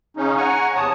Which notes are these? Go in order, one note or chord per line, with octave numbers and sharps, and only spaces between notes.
C#3 C#4 D#4
F#5 G#5 A#5 C#6
E2 C3 C#5 A5 D#6